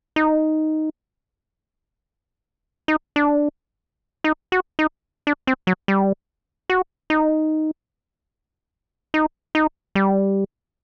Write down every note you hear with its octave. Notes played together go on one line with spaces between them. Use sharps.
D#4
D#4
D4
D#4
F#4
D#4
D4
C4
F#3
G3
F#4
D#4
D#4
D#4
G3